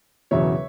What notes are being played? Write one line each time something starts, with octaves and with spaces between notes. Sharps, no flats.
E1 E2 C#3 F#3 C#5 E5